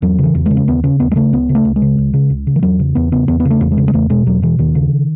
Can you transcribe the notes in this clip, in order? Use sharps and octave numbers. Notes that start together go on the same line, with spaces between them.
E2 F#3
C#3
E3
E2
C#3 G#3
C#4
D#2 B3
C#3 C#4
D#2 B3
G#3
C#3 A3
C#2 B3
C#3
A3
C#2
G#3
C#3
C#2
C#3
C#2
C#3
E3
E2 F#3
C#3
E2 B3
C#3 B3
E2 B3
B3
C#3
A3
E2
G#3
C#3
G#3
E2 A3
B2 G#3
E2 F#3
B2 E3
D#2 D#3
C#3